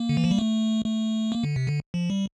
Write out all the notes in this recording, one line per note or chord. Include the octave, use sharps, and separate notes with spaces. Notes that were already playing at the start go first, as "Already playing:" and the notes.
Already playing: A#3
D3
E3
F3
G3
A3
A3
A#3
D3
C3
D3
F3
G3